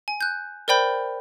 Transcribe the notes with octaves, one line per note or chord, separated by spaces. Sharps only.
G#5
F#6 G6
A#4 C5 D5 G5 B5 G6